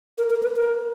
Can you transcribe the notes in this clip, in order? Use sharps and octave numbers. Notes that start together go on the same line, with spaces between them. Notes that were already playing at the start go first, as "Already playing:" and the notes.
A#4
A#4
B4
A#4